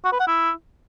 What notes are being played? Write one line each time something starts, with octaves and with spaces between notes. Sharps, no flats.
F#4
B4
F#5
E4